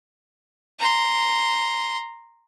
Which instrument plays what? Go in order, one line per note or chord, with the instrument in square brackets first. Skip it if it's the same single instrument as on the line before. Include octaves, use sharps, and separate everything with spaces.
[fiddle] A#5 C6